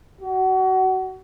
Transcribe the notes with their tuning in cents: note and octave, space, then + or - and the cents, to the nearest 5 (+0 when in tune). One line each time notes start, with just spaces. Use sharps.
F#4 +25